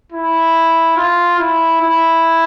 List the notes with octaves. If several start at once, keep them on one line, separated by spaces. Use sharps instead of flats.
E4
F4
E4
E4